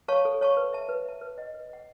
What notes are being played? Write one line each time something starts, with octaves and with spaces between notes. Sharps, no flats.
C#5 F5 A5 C#6
A4
C#5 F5 A5 C#6
B4
E5 A5
B4
E5 A5
B4
D#5 F#5
B4
D#5 F#5